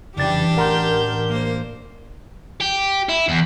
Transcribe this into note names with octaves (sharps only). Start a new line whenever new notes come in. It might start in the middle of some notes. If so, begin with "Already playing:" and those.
F2 C#3 E3 G3 D4 G4 A6
A1 A#4 F#5 A#5 C6 G6
A#3 C5
G4
E4
E2